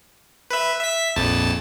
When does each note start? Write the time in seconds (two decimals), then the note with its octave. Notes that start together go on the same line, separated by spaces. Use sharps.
0.50 B4 E5
0.80 E5 B6
1.16 A#1 F2 A5